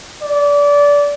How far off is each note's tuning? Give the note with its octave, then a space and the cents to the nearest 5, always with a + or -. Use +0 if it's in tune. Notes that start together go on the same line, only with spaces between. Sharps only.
D5 -25